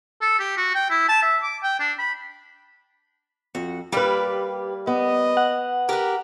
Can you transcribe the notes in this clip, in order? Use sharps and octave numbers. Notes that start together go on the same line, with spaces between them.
A4
G4
F#4
G5
E4
A5
E5
D6
G5
D4
B5
F2 F#4
G3 A#3 G4 B4 D5
B3 D#5
F#5
G4 A#4 B4